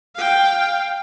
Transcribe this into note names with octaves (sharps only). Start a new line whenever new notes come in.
F5 G5